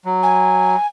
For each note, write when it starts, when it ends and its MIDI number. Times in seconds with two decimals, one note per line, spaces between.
0.05 0.76 54
0.23 0.87 80